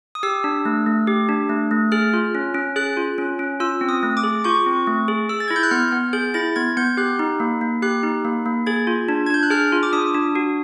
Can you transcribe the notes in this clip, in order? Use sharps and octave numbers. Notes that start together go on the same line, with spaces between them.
D#6
G4 E6
D4
A3
A3
G4
D4
A3
A3
G#4 F6
F4
C#4
C#4
G#4 F#6
F4
C#4
C#4
F4 E6
C4
D#6
A3
D6
G#4
F4 C#6
C4
A3
G#4
G#4 E6
A6
E4 G#6
G6
F#6
B3 F6
B3
G#4 G6
E4 A6
B3 G#6
B3 G6
G4 F#6
D#4
A#3
A#3
G4 F#6
D#4
A#3
A#3
G#4 G#6
F4
D4
G#6
D4 G6
F#6
G#4 F6
F4
D6
D4 D#6
D4
F#4